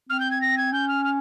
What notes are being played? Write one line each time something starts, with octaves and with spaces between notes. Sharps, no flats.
C4 F6
G6
G#6
A#6
G#6
C#4 G6
F6
F6